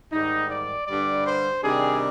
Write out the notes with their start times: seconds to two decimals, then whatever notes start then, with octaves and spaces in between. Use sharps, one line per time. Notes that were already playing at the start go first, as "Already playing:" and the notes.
0.12 G#2 D#3 G3 D#4
0.50 D5
0.87 G2 D3 G3 D5
1.26 C5
1.63 C3 D#3 G3 D4 G#4